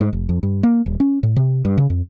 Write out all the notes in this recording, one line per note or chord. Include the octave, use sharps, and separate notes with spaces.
G#2
F1
F2
G2
A#3
D#1
C#4
A2
C3
G2
C#3
F2